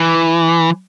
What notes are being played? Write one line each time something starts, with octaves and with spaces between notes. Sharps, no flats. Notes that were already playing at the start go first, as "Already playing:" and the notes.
Already playing: E3